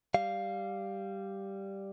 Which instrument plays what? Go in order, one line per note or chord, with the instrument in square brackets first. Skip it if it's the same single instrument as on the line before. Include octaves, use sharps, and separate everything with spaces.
[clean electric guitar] G3 F5